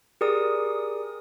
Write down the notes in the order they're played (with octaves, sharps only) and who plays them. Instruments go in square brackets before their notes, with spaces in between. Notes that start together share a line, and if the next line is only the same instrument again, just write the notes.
[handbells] G4 G#4 A#4 D5 D#6